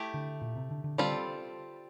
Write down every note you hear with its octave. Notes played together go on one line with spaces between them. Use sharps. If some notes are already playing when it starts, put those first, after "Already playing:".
Already playing: A3 E4 G4
D3
A#2
C3
D3
D3
D3 G3 C4 F4 A4